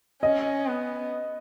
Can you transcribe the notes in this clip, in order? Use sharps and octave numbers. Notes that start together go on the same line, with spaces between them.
C#4 D#5
B3